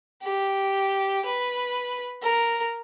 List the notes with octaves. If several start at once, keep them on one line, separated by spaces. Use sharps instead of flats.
G4
B4
A#4